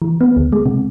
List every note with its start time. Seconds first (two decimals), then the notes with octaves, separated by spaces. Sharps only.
0.02 E3
0.21 B3
0.36 D2
0.52 G#3
0.66 C3